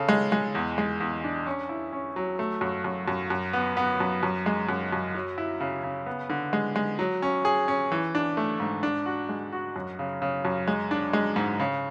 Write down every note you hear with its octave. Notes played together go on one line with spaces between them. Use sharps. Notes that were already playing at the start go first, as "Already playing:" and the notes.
Already playing: C#3 A4
G#3
G#3
E2
G#3
E2
D4
C#4
E4
C#4
F#3
A3
F#2
F#2
F#2
F#2
B3
B3
F#2
F#2
G#3
F#2
F#2
F#3
E4
C#3
C#3
B3
D3
G#3
G#3
F#3
C#4
G#4
C#4
E3
D4
A3
G#2
D4
F#4
G#3
F#4
F#2
C#3
C#3
F#2
G#3
D4
G#3
G#2
C#3